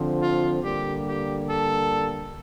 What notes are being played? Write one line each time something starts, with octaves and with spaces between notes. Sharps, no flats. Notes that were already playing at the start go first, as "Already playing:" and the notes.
Already playing: D3 F3 C4
F4
D3 G3 A#3 G4
G4
A4